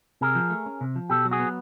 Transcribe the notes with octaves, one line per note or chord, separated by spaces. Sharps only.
C3 G#4 A#4
F3
A3
C#4
C3
F3
B2 G4 A4
F#3
F#4 G#4
B3